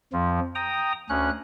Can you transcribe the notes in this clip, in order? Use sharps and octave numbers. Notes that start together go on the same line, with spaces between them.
F2 F3
G5 A#5 D#6
D2 C#4 F#6